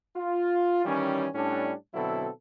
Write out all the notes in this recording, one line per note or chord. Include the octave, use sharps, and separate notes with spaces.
F4
D#3 E3 G3 C#4
A2 G3 C#4 D4
B2 D3 F#3 C4 E4 A4